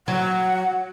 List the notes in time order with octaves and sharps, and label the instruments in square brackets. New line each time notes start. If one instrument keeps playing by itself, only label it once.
[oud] F#3 [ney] F#5